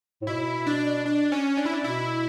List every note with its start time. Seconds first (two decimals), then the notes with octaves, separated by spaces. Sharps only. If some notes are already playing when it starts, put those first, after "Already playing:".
0.22 A2
0.27 B2 E4
0.66 D4
1.06 D4
1.32 C#4
1.57 D4
1.65 E4
1.73 D4
1.84 B2 E4